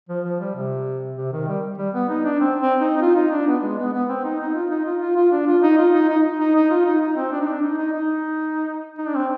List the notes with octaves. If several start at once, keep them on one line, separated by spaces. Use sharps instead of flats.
F3
F3
G3
C3
C3
D#3
G3
G3
B3
D#4
D4
C4
C4
D#4
D#4
F4
D#4
D4
B3
G#3
B3
B3
C4
D#4
D#4
F4
D#4
F4
F4
F4
D4
F4
D#4
F4
D#4
D#4
D#4
D#4
F4
D#4
D#4
C4
D4
D#4
D4
D#4
D#4
D#4
D#4
D4
C4